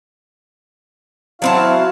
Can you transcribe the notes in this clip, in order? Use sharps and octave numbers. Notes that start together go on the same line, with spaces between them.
F#3 C4 E4 F#4 F5 A5